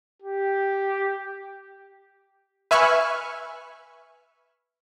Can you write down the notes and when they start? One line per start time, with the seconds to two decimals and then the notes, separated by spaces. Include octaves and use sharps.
0.22 G4
2.71 B4 E5 G#5 B5 C#6 F6